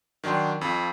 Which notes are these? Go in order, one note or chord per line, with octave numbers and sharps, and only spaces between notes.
D#3 F#3 D4 G5 C6
F2 F3